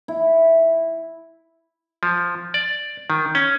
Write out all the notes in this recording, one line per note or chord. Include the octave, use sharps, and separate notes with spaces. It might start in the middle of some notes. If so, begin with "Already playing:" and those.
E4
F3
D5
D#3
C#4